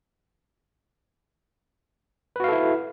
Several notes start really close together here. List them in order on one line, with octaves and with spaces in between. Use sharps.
B4 F#4 F5 A4 E4